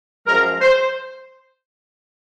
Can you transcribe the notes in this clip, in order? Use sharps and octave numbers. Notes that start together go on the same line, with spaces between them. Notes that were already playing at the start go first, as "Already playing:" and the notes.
F#2 F3 G#3 A#4
C5